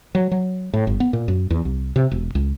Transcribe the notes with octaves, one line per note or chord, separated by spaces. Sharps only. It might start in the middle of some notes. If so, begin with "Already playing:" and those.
F#3
F#3
A2
G1
B3
A#2
F#2
E2
C2
C3
E1
C#2